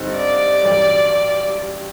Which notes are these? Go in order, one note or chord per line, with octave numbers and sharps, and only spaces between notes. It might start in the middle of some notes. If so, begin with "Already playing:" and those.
Already playing: G2 D3 G3 C4 D#4
D5
A1 G2 F#3